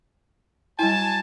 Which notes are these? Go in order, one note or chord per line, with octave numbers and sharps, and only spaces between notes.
F#3 G3 E4 G#5 A5